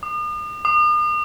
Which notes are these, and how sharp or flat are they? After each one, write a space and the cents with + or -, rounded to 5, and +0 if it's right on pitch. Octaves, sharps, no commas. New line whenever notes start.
D#6 -45
D#6 -45